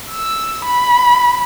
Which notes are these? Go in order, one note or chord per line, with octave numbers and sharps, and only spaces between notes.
E6
B5